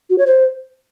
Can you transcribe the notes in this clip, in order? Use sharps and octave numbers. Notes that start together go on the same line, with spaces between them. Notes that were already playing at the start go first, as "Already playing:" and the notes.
F#4
C#5
C5